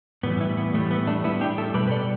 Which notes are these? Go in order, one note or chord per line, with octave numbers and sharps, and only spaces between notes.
A2 E3 G3 B3
B3 E4
B3
A2 E3 G3 A3
B3
A3 D4
A2 G3 B3 E4
D4 G4
E4 A4
B2 G3 G4 B4
B4
A4 D5